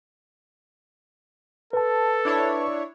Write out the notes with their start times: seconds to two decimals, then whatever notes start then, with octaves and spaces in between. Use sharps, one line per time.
1.73 A4 B4 A5
2.25 D4 E4 C#5